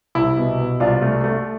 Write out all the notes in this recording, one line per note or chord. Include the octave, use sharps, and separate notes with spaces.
C2 E4
B2
B2
C2 D4 F4
A3
A3